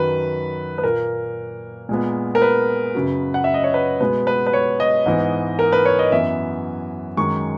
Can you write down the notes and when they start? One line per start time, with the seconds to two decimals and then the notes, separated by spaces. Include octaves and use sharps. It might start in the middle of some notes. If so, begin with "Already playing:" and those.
Already playing: F#2 D#3 F#3 B4
0.78 B4
0.83 A#2 A#3 A#4
1.89 A#2 G#3 B3
2.35 A#4
2.42 B4
2.95 F#2 C#3 F#3
3.34 F#5
3.44 E5
3.54 D#5
3.64 C#5
3.74 B4
4.00 B2 G#3 B3 B4
4.27 B4
4.46 B4
4.53 C#5
4.80 D#5
5.06 G#2 E3 B3
5.59 A#4
5.72 B4
5.85 C#5
5.99 D#5
6.12 F#2 E3 B3 E5
7.17 F#2 D#3 G#3 C#6